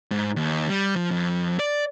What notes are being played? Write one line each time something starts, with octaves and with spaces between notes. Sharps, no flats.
G#2
D#2
G3
F3
F2
D5